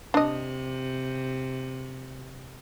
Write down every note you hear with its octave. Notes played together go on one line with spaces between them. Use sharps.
C3 D4 D#5